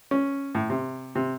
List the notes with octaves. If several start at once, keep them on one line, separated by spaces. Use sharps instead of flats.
C#4
A2
C3
C3